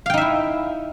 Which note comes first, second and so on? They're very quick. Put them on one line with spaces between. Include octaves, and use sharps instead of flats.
F5 G5 D#4 E5 E4